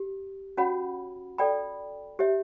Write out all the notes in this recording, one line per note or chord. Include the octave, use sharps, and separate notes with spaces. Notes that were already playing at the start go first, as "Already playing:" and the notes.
Already playing: G4
C#4 F#4 C#5 F#5 B5
A4 D5 G5 B5
G4 C#5 E5